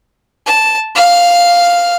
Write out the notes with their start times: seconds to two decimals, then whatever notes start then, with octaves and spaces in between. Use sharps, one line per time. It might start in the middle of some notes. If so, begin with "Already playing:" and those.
0.46 A5
0.95 F5 F6